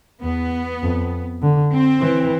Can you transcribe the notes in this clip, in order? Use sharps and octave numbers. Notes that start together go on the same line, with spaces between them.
E2 B3
F2
D3
C4
E3